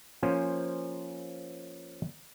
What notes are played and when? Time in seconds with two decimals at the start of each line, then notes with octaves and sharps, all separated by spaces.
0.23 F3 A#3 C#4 C5 G#5